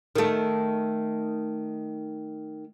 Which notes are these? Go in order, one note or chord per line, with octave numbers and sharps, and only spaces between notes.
D#3 A3